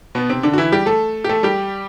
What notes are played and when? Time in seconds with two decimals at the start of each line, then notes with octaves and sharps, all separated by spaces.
0.15 B2 B3
0.29 C3 C4
0.43 D3 D4
0.54 F#4
0.58 E3 E4
0.72 G3 G4
0.86 A3 A4
1.24 G4
1.29 A3 A4
1.43 G3 G4